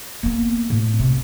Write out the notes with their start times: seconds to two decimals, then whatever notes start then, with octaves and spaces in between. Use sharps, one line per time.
0.23 A#3 B3
0.70 A2
0.99 C3 A3